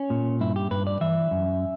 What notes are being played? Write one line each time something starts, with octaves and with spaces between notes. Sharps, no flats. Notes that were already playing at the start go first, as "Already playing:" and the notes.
Already playing: C#4
A#2
G2 E4
G4
G2 B4
D5
E3 E5
F#2